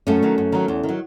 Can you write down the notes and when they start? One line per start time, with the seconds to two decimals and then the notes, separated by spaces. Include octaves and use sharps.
0.07 F#2 A3 C#4
0.22 D#3 F#3
0.38 F#2
0.52 D#3 F#3
0.68 E2
0.83 D#3
0.89 F#3